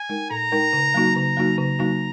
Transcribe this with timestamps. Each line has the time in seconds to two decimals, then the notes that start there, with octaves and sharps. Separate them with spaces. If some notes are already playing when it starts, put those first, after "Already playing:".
Already playing: G#5
0.09 G#3 D#4 A#4
0.31 A#2 A#5
0.52 G#3 D#4 A#4
0.73 C#3
0.94 F#3 A#3 D#4 F#4
1.16 C#3 A#5
1.37 F#3 A#3 D#4 F#4
1.58 C#3 A#5
1.79 F#3 A#3 D#4 F#4